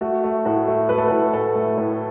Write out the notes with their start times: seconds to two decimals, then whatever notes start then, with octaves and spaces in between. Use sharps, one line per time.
0.01 A3 F#4
0.24 A3
0.45 A2 F#4
0.68 A3
0.89 A3 B4
0.98 A4
1.08 A2 B4
1.33 A2 A4
1.55 A3
1.78 A2